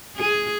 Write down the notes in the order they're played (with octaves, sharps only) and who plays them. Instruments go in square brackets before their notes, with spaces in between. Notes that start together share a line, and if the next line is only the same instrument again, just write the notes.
[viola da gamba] G#4